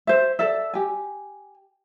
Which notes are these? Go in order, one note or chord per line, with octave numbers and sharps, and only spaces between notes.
C5 E5
A4 D5 E5
G4 G#5